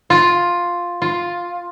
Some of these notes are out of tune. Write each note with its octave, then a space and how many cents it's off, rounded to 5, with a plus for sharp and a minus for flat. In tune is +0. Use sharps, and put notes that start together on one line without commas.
F4 +5
F4 +5